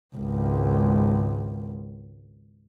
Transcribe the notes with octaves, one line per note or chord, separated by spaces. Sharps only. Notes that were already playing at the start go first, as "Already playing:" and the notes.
G#1 C#2